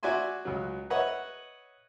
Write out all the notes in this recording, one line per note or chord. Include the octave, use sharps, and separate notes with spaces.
F#4 D5 E5 G#5 C6
C#2 F#3
B4 C#5 D#5 E5 F#5